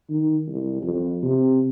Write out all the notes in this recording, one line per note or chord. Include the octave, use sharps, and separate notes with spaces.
D#3
C2
F2
C3